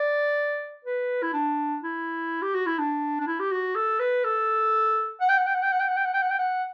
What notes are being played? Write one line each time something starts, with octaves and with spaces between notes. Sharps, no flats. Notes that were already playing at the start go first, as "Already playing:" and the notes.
Already playing: D5
B4
E4
D4
E4
G4
F#4
E4
D4
D4
E4
G4
F#4
A4
B4
A4
F#5
G5
F#5
G5
F#5
G5
F#5
G5
F#5
G5
F#5
G5
F#5
G5
F#5